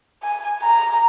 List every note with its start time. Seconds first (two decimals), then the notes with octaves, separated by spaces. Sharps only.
0.23 G#5
0.63 A#5